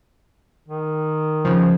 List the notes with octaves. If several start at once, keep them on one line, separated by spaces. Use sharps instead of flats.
D#3
C#3 F3